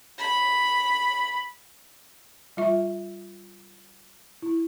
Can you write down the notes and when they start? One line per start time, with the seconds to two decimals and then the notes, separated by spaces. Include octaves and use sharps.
0.18 B5
2.57 G3 F4 E5 C#6
4.42 E4